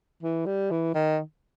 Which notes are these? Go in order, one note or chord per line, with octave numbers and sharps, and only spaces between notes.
E3
G3
E3
D#3